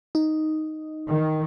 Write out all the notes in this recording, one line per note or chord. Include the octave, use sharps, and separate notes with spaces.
D#4
D#3